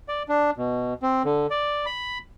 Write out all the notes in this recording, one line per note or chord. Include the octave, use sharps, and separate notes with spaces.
D5
D4
B2
C4
D3
D5
B5